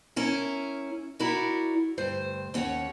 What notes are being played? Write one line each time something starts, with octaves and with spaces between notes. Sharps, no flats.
C#4 E4 A#4
E4 F#4 A#4 D5
D2 G2 C5
D#2 C#4 C#5 F#5